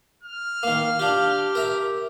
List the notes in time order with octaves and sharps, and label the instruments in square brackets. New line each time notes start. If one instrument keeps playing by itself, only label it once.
[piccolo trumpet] F6
[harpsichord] D#3 A#3 [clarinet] F5
[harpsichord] D4 F4 [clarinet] G4
[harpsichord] A#4 E5 A#5